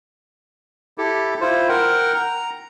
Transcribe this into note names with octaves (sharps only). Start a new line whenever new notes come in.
E4 G4 A4
E4 F4 C5
A#4 F#5 G5
A#5